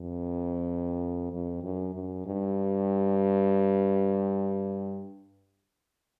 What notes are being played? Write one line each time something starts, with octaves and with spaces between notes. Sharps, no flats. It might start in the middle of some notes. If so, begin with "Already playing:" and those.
Already playing: F2
F2
F#2
F#2
G2